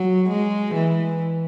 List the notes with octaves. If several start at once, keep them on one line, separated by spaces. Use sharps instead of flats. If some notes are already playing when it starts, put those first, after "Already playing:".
Already playing: F#3
G#3
E3